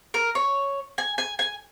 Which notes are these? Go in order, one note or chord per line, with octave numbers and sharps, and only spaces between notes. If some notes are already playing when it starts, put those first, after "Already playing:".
A#4
C#5
G#5
G#5
G#5